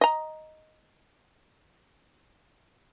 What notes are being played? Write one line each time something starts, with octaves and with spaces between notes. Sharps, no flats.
D#5 A#5